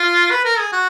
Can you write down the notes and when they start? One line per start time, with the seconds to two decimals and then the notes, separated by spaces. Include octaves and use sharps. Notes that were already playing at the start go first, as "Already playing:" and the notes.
Already playing: F4
0.31 B4
0.45 A#4
0.59 G#4
0.73 F#4